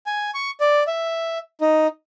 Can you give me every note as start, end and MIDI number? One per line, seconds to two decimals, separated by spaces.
0.06 0.31 80
0.34 0.51 85
0.61 0.83 74
0.88 1.38 76
1.61 1.87 63